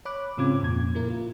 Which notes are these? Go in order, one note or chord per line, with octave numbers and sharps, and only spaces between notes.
C#5 B5 D6 F#6
G#2 C#3 C4 F4 D6 G#6
F2 A#2 G#6
A#3 E4 A#4
F4